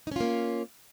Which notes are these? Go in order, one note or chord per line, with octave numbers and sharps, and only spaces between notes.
A#3 C#4 D#4 F4